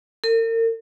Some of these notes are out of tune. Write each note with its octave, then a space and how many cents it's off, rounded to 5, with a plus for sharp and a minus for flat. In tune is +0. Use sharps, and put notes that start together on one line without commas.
A#4 -40